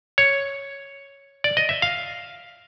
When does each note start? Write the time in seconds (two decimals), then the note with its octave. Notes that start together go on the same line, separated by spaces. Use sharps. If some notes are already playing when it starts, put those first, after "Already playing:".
0.18 C#5
1.44 D5
1.57 D#5
1.69 E5
1.82 F5